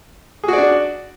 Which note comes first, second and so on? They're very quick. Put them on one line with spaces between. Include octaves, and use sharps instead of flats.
G#4 F#4 D5 D4